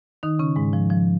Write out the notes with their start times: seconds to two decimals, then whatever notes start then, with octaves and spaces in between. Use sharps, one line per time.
0.23 D#3 D#4
0.39 C#3 C#4
0.56 G#2 G#3
0.73 F3
0.90 F3